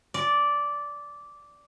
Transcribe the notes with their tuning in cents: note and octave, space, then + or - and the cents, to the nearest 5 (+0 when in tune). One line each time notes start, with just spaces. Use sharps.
D5 -10